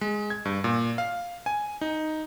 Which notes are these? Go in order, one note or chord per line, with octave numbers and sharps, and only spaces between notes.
G#3
G#6
G2
A#2
F5
G#5
D#4